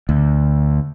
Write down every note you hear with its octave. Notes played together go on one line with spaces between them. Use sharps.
D2